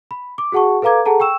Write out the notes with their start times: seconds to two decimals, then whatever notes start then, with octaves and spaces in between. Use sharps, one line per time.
0.11 B5
0.38 D6
0.52 F#4 G#4 F#5 A5 C#6
0.82 A4 B4 F5 A#5 D6 G#6
1.05 G#4 A4 F#5 A5 A#5
1.20 G5 C#6 E6 E7